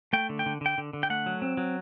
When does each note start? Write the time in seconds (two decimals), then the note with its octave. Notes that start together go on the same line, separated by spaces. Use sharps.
0.13 A3 G5
0.29 D3
0.39 G5
0.46 D3
0.61 D3 G5
0.78 D3
0.93 D3
1.03 G5
1.10 A3 F#5
1.26 F#3
1.42 C4
1.57 F#3